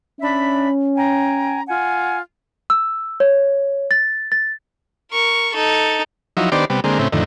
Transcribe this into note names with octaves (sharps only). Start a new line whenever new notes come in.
C#4 D4 E5 B5
G5 G#5 A#5
F4 F#5 G#5
E6
C#5
A6
A6
A#4 C#6
D#4 A4
F3 F#3 D#4 E4
D#3 B3 D4 G4 C5 D5
C3 G3 B3
D3 G#3 A#3 C4
A2 C#3 C4 E4
F2 A2 D3 D#3